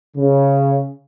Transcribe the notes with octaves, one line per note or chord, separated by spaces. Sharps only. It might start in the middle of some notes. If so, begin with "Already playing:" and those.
C#3